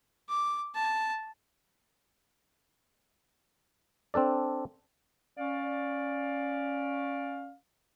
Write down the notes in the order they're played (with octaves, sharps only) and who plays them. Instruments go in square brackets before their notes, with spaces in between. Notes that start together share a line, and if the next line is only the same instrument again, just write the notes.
[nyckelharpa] D6
A5
[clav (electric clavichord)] C4 D4 A4 D5
[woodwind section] C#4 D5 F5